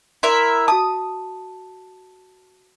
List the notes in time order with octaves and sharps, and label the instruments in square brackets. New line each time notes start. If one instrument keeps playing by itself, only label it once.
[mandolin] E4 A#4 E5 [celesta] C6
[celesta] F#4 A5 [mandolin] D#6